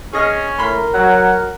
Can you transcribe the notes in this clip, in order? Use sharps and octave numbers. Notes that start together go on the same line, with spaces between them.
C#4 G#4 D#5 F6
A2 A#4 B5 C6
F#3 F#5